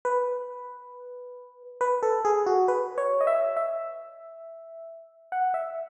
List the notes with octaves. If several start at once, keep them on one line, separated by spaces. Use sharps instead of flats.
B4
B4
A4
G#4
F#4
B4
C#5
D#5
E5
E5
F#5
E5